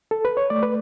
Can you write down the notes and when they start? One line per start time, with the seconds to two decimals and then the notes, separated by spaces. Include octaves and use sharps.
0.11 A4
0.25 B4
0.37 C#5
0.50 A3 D5
0.63 B4